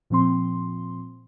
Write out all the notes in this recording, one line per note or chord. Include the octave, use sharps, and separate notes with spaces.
A#2 F3 C4 C6